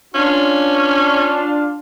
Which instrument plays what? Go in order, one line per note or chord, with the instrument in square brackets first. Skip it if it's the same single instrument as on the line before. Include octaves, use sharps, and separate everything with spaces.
[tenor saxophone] C#4 [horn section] D4 F4